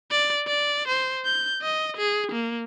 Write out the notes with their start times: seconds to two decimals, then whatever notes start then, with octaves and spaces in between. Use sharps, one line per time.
0.11 D5
0.47 D5
0.88 C5
1.25 G6
1.62 D#5
1.97 G#4
2.32 A#3